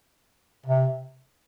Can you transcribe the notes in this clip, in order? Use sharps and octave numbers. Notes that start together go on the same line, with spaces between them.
C3